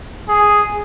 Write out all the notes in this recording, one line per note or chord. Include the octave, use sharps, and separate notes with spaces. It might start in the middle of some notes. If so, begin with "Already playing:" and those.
G#4